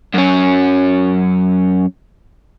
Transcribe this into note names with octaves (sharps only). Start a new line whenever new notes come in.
F#2 C#4